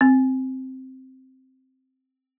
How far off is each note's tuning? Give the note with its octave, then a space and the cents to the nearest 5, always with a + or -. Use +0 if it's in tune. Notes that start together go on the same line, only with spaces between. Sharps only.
C4 +0